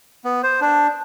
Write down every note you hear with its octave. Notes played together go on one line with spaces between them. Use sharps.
B3
C5
D4